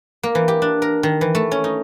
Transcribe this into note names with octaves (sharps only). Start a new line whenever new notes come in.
A#3
E3
G4
D4
A#4
D#3
E3
A3
C#4
D#4